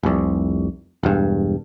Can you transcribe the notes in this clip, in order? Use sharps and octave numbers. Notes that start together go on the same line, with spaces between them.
F1 C2
E1 G2